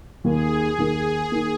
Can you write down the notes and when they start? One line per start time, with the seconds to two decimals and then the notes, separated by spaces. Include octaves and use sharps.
0.24 D#2 D#3 A#3 G#4
0.78 D#2 D#3 A#3
1.32 D#3 A#3